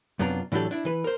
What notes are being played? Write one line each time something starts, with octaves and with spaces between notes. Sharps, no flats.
F#2 C3 B3 D4 F4 A#5
A2 E3 F#3 D4 G4 A4
D4 E4
E3 B4
A#4 C5